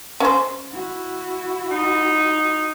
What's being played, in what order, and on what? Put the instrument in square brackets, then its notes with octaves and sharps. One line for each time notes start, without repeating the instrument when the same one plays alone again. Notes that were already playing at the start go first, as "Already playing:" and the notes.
[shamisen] C#4 C5
[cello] E4 F#4
[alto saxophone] D#4